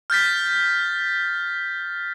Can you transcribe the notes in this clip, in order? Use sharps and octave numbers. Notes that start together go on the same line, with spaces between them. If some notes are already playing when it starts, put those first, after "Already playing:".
F6 G6 A6 B6